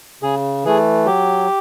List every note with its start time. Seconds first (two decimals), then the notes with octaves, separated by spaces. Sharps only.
0.23 C#3 G#4
0.65 E3 A3 G#4
1.06 F#3 G4